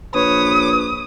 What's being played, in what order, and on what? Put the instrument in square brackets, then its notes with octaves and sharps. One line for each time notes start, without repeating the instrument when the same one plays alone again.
[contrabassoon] A#1 [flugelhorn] B4 [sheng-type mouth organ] C#5 [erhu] D#6